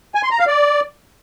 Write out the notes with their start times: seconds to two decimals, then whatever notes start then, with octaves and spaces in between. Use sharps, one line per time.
0.15 G#5
0.23 C6
0.31 A#5
0.39 F5
0.47 D5